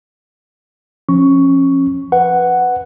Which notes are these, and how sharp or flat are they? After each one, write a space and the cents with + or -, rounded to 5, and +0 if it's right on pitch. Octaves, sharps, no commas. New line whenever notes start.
F3 +0 C#4 -25 C#6 +10
B4 +10 F#5 +0